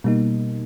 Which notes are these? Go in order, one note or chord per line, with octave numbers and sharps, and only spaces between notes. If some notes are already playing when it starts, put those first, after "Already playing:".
B2 G3 A#3 D#4